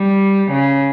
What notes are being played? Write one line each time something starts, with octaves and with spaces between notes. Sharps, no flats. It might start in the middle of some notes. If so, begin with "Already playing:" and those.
Already playing: G3
C#3